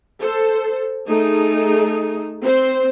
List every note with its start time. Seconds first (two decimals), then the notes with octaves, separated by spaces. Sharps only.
0.20 A4 C5
1.08 A3 D#4 G#4 A4
2.43 C4 C5